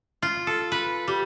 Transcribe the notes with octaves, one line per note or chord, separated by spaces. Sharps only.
F4
A4
B4
G3